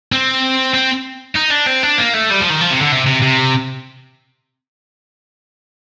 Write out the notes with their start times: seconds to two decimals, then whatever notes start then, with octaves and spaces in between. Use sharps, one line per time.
0.12 C4
0.74 C4
1.36 D#4
1.51 D4
1.67 C4
1.83 D4
1.98 A#3
2.14 A3
2.30 G3
2.40 F3
2.50 D#3
2.61 F3
2.70 C3
2.81 D3
2.92 C3
3.06 C3
3.22 C3